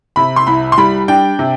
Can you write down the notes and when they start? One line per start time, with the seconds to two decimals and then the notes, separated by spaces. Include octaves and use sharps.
0.16 C3 B5
0.36 C6
0.47 C2 B5
0.72 C6
0.78 G3 B5
1.08 D4 G5
1.39 C3